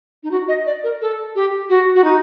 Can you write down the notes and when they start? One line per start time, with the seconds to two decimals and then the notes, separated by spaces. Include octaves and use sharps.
0.23 D#4
0.31 F#4
0.48 D#5
0.66 D5
0.84 A#4
1.01 A4
1.35 G4
1.70 F#4
1.95 F#4
2.04 D#4